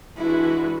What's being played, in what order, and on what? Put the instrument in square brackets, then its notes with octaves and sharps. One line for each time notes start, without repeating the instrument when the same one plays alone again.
[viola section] E3 G#3 D4 F#4 B4 [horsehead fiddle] E4